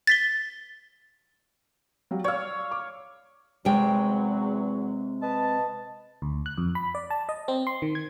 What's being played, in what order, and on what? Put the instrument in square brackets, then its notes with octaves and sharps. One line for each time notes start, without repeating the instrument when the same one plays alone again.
[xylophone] A6 B6 G7
[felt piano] F#3 G3 F5
[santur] C#5 F5 [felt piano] D5 E6
[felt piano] D6
[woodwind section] E2 F#3 [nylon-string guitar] C3 G#3 G5
[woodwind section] B4 D#5 A5
[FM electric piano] D2
F#6
F2
B5
D5
A5
D#5
C4
C6
D#3
G#6